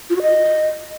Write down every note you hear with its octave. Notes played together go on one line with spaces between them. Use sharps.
F4
F#4
D#5